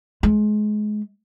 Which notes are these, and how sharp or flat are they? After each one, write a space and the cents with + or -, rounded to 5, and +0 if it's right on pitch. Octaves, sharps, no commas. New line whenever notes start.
G#3 +25